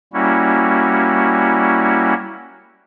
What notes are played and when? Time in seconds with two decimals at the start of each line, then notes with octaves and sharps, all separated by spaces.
0.13 G3 A#3 C#4 E4 F#4